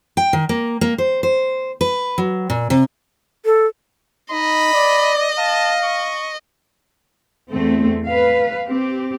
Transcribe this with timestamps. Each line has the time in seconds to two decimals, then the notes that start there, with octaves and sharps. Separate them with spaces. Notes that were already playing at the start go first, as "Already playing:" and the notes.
0.17 G5
0.33 D#3
0.49 A#3
0.81 A#3
0.98 C5
1.23 C5
1.81 B4
2.18 F#3
2.50 A#2
2.70 C3
3.45 A4
4.32 D#4 D#5 B5
4.73 D5
5.38 F5 A5
5.84 C#6
7.50 E2 A3 C4
8.08 B4 F5
8.66 C4 G4